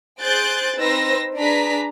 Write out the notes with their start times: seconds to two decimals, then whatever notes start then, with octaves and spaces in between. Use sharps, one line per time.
0.20 G#4 C5 F#6 G6 A6 D7
0.77 C4 D#4 B4 C5 E6 A#6
1.36 D4 G#4 B4 A#5 B6